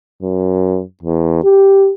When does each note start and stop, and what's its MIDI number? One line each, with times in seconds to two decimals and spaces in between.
0.23 0.81 42
1.03 1.39 40
1.44 1.92 67